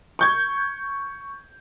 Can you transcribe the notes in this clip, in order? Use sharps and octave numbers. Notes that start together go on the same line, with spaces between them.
C#6 G6 G#6